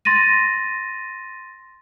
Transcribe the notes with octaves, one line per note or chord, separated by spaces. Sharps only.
C6 A6 A#6 D#7